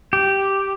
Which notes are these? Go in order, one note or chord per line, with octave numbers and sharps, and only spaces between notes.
G4